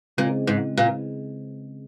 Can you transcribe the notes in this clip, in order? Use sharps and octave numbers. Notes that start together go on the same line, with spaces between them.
A#2 C#3 G#3 C4
G#2
A#2